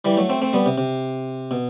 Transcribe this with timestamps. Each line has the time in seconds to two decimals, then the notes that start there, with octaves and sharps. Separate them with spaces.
0.05 E3 G3
0.17 F#3 A3
0.29 A3 C4
0.42 A3 C4
0.53 G3 B3
0.66 C3
0.78 C3
1.51 B2